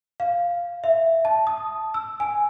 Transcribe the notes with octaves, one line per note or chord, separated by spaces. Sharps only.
F5
E5
A5
D#6
E6
G#5